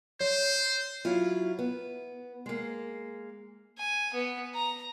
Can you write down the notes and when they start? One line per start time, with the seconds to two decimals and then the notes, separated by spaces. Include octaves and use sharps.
0.20 C5 C#5
1.05 F#3 E4 F4
1.59 B3
2.46 G#3 A#3
3.78 G#5
4.14 B3
4.55 A#5